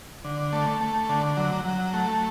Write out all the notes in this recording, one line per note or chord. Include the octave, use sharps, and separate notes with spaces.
D3
A3
A3
D3
F#3
F#3
A3